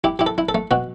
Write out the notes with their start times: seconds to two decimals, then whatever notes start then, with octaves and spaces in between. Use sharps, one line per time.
0.04 E4 G4
0.19 E4 G4
0.26 A4
0.38 E4
0.49 A4
0.55 A3
0.71 B2 F#4